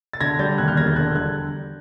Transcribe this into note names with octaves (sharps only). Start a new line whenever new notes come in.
A6
D3 G#6 A#6
G3 G6 A6
D#2 F#6 G#6
F6 G6
E1 G#6 A#6
G6 A6
D3 F#6 G#6
G6
G3 F#6 G#6